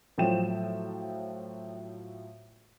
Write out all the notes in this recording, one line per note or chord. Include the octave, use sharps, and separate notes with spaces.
A2 F3 F#3 G5 E7